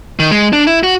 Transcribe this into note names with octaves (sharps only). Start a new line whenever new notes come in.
D#3
G#3
D4
E4
F#4